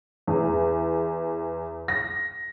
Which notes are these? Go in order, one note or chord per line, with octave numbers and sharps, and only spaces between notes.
E2
A#6